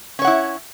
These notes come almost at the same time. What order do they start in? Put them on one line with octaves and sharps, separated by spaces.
C#4 C#5 F#5 E4